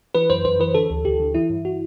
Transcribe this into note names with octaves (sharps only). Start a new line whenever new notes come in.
E3 B4
F#2 C5
F#2 C5
E3 B4
D3 A4
D2
D2 G4
D3
E3 E4
G2
F#4